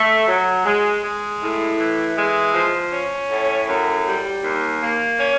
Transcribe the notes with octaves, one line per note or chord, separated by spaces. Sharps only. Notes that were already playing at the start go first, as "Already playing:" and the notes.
Already playing: A3
F#3
G#3
G#3
A2
E3
G#3
F3
C#4
A2
F#2
G3
D#2
A#3
C#4